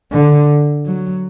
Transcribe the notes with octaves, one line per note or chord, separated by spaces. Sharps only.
D3
F#3